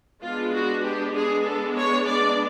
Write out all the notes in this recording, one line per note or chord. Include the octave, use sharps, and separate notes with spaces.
G#3 B3 D4 F4
F#4
G4
G#4
A4
C#5
D5